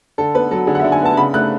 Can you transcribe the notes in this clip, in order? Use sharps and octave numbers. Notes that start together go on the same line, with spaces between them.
D3 A4
B3 B4
F#3 A4
D3 G#4
F#5
D3 E5
G#5
B3 A5
C#3 B5
A3 F#6